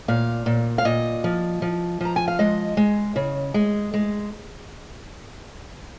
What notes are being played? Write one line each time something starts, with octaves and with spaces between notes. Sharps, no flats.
A#2 F5
A#2
F5
A#2 D#5
F3
F3
F3 A#5
G#5
F5
G#3 D#5
G#3
C#3
G#3
G#3